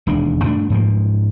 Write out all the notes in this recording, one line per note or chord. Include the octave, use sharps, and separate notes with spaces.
E1 D#2 G#3 D4
G2 A3 A#3 D4
G#2 F3 A#3